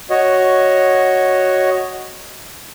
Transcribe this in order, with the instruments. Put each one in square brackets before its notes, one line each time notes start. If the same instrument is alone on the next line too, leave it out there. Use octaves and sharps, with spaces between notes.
[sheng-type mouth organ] F#4 C#5 D#5